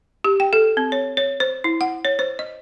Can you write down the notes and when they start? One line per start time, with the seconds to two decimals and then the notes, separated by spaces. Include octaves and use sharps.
0.24 G4
0.40 G5
0.53 A4
0.77 C4
0.92 C#5
1.17 C#5
1.40 C5
1.64 E4
1.81 F#5
2.05 C#5
2.19 C5
2.39 D#5